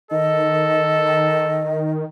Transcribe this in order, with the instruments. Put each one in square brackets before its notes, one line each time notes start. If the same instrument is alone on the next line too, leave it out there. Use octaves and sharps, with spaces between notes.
[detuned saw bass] D#3 [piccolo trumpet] A4 [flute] D#5